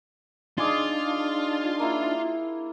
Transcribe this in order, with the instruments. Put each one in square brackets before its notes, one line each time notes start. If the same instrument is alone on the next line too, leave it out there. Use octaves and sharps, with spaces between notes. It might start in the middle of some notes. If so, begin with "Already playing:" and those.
[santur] G#3 G#4 D6 [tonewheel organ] D4 D#4 A5 [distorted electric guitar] F4
[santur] A#3 E4